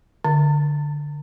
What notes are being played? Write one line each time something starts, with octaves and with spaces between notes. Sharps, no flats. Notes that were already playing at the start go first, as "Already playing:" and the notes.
D3